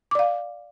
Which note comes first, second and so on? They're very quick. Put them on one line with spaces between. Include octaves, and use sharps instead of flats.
D6 D5 F5